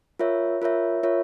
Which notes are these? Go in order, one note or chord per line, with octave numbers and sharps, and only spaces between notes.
F4 A#4 C#5 E5
F4 A#4 C#5 E5
F4 A#4 C#5 E5